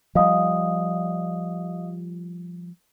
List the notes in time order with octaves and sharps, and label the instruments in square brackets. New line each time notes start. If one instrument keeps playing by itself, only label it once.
[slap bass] F3 G3 [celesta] D#5 F5 D#6